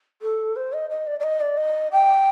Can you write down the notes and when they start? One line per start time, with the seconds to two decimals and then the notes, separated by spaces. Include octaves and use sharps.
0.22 A4
0.56 C5
0.73 D#5
0.90 D#5
1.07 D5
1.20 D5
1.23 D#5
1.41 D5
1.57 D#5
1.92 G5